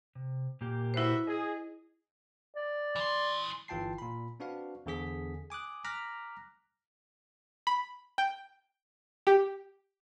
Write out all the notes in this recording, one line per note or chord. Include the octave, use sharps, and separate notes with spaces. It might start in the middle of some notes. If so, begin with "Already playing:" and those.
C3
A#2 A#3 G4
E4 F#4 B4 C5 E5
G#4 D#5
D5
E3 C6
G1 E3 F4 G5 A5 C7
A#2 B5
C4 D4 F#4 B4 F5
E2 D3 G#4 B6
G#5 D6 D#6 F#6
A#5 D6 F6 F#6 A#6 B6
B5
G5
G4